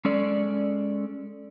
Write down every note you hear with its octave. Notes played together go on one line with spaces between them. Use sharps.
G#3 C#4 A4 D5